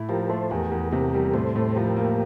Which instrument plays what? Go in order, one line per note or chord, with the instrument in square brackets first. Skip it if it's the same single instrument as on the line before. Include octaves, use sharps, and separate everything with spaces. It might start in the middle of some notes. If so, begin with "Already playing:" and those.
Already playing: [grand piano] A2 A3 E4
[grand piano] F3 [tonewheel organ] G4 A#4
[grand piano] A3 [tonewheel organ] A4 C5
[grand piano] E2 [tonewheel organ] G4 A#4
[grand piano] E2
[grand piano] C3 [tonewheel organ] G4 A#4
[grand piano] G3
[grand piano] A2 [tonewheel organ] A4 C5
[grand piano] A2
[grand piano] F3 [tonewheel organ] G4 A#4
[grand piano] A#3